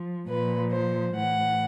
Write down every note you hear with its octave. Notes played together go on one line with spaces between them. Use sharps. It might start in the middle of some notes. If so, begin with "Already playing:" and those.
Already playing: F3
A#2 F3 B4
C5
A2 E3 F#5